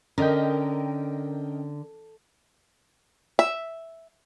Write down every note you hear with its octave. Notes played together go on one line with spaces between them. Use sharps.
D3 C#4 A#4 D#5 G5
E5